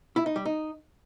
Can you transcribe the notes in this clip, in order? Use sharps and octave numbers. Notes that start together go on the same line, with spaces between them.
E4
D#4
G3
D#4